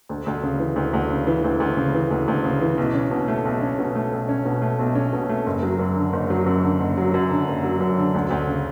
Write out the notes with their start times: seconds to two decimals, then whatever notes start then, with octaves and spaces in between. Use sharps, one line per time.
0.09 D2
0.26 D2
0.43 C#3
0.59 E3
0.76 D2
0.93 D2
1.10 C#3
1.27 E3
1.44 D2
1.60 D2
1.77 C#3
1.94 E3
2.11 D2
2.28 D2
2.44 C#3
2.61 E3
2.78 B1
2.94 C#4
3.11 B2
3.28 A3
3.45 B1
3.61 C#4
3.79 B2
3.95 A3
4.11 B1
4.29 C#4
4.45 B2
4.62 A3
4.79 B1
4.95 C#4
5.13 B2
5.29 A3
5.46 F#1
5.63 F#3
5.79 F#2
5.96 D3
6.13 F#1
6.30 F#3
6.46 F#2
6.63 D3
6.80 F#1
6.98 F#3
7.14 F#2
7.31 D3
7.48 F#1
7.64 F#3
7.80 F#2
7.98 D3
8.14 D2
8.31 D2
8.47 C#3